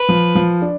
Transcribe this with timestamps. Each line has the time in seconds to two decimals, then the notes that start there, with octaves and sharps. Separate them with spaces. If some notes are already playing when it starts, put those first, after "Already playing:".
Already playing: B4
0.09 F3
0.35 F3
0.62 D4